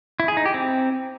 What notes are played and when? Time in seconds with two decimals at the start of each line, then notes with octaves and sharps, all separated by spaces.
0.20 E4
0.28 G#4
0.37 D#4
0.46 G4
0.54 C4